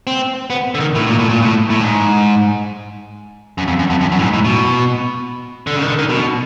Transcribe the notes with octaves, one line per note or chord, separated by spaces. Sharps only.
C4
B3
D3
D#3
A2
A#2
A2
A#2
A2
A2
G#2
F#2
F2
F#2
F2
F#2
F#2
A2
G#2
A2
B2
D3
C#3
D#3
D3
D#3
B2